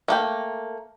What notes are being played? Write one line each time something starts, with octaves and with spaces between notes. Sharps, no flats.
A3 A#3 G5